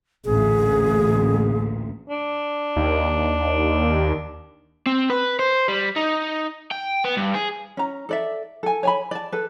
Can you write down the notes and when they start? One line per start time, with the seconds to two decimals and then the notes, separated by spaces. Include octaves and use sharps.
0.25 A1 D2 A#2 G#4
2.09 D4
2.76 D#2
4.86 C4
5.10 B4
5.39 C5
5.68 G3
5.96 D#4
6.71 G5
7.04 B3
7.17 G2
7.34 G#4
7.77 C#4 A#5
8.09 A4 D5 E5
8.63 A4 G#5
8.83 C#5 G#5 B5
9.11 D5 A5
9.32 A4 B4